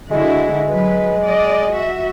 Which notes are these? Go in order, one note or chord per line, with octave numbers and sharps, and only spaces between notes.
D3 G#3 E4 F#4
F#3 B4
D5 D#5
F#4 E5